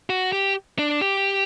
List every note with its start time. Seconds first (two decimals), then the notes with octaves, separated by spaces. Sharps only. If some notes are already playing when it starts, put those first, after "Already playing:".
0.10 F#4
0.32 G4
0.79 D4
1.01 G4